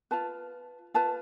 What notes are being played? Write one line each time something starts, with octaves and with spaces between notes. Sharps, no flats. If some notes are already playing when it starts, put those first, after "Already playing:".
F4 B4 A5
F4 B4 A5